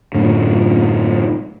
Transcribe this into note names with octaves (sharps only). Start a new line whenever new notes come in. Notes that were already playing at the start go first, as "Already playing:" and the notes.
F#2 A2 D3